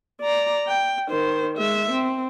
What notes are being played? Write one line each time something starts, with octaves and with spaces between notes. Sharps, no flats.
D5 A#5
G5
D#3 C5
G#3 E5
C4